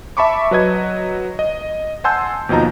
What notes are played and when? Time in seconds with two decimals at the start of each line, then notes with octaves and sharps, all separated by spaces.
0.17 E5 A5 B5 C#6 D6
0.51 F#3 B4 D#5 G#6
1.39 D#5
2.04 F#5 G#5 A5 C6 E6 G6
2.49 D#2 B2 F3 D#5 A#5